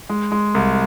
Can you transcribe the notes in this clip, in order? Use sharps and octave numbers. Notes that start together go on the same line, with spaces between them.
G#3
G#3
C2